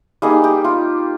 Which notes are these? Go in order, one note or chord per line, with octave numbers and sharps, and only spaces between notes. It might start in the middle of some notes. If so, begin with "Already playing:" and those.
G3 A#3 D#4 G#4
G4
F4